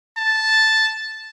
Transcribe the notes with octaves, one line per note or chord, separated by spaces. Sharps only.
A5